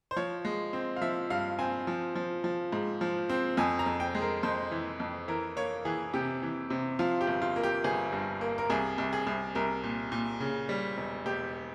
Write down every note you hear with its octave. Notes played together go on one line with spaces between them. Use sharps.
C5
F3 C#5
G#3
C4
F5
F3 E5
G2 F5
C4 G#5
F3
F3
F3
G#2
F3
C4
F2 G#5
A#5
F2
G5
G#3
A#4
F2 C5
E3
F2
E3 A#4
A#3 C#5
E3 G#4
C3 G4
E3
C3
F3 F4
G4
G1
F4
A#3
G4
G1 G#4
G2
A#3
A#4
C2 G#4
C2
G#4
C2
C2 A#4
A#2
A#2
C#3
G3
E1
E1 G4